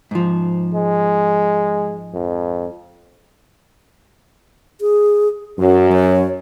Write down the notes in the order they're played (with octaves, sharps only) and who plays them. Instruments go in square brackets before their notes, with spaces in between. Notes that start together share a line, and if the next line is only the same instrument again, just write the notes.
[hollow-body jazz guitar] G#2 F3
[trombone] G#3
F2
[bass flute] G#4
[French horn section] F#2 [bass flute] F#3
[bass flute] C#5